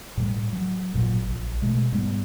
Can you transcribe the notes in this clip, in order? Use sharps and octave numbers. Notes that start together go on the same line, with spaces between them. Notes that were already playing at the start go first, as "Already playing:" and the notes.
A2 F#3 G3
F#3
G#1 A#2 C#3 F#3
A#1
B2 G#3 A3
G#2 G3 B3